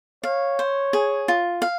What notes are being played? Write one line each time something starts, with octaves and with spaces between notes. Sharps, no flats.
C#5 F5
C5
G#4
F4
F5